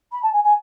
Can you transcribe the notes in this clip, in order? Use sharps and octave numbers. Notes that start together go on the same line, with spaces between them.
B5
A5
G#5
G#5